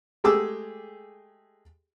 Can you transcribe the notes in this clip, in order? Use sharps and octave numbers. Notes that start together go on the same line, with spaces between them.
G#3 A3 G4 G#4 D6 E6